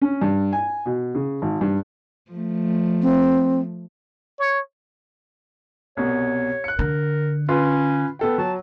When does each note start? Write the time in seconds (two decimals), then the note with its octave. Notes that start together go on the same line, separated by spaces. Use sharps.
0.02 C#4
0.21 G2
0.53 G#5
0.86 B2
1.15 C#3
1.42 G#1
1.61 G2
2.31 F3 A3
3.02 C4
4.39 C#5
5.97 C2 B2 C#5
6.64 F#6 C#7
6.79 D3 A#4
7.48 C#4 F4 B4 C6
8.19 B3 A4 G5
8.38 F#3 A5